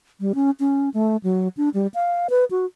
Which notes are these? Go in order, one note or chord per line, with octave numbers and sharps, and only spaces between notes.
G3
C#4
C#4
A3
F#3
D4
G3
F5
B4
F#4